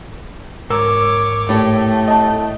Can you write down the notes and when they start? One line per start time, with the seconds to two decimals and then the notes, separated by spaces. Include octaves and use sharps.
0.70 G#2 A#4 C#5 D6 E6
1.49 A2 A3 G4
2.08 D#5 A5